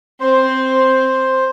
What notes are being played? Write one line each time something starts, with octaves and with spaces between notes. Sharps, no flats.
C4 C5